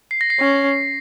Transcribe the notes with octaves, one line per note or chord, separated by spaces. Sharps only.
C7
A#6
C7
C#4